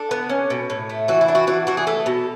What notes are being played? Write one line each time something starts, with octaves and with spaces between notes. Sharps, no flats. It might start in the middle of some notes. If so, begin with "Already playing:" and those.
Already playing: D4 A4
B3
C#4
B2
A2
A3
E3 F#4
E4
D4
F#4
E3 F#4
E3 F#4
G#4
A3 A4
B2